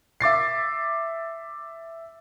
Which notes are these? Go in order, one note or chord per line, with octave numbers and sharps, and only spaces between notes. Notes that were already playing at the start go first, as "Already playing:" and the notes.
E5 D6 A6 C7